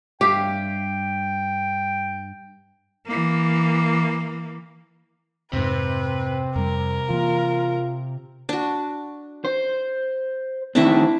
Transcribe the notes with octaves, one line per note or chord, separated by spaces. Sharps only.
G2 G4 E5 F5 G5
E3 A#3
F2 G#2 C3 C4 B4
F2 G3 A#4
E3 A#3 F4
D4 F#4
C5
D#3 A3 C4 D4 E4 E5